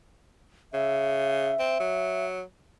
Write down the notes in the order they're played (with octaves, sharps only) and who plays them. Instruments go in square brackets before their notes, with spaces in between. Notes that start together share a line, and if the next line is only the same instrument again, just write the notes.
[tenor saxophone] C#3 [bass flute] E5
[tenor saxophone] C4
F#3